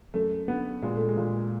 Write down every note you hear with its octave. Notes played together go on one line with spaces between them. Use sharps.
F#2 A3
D3 B3
A#2 G#3
A3
G#3
A#2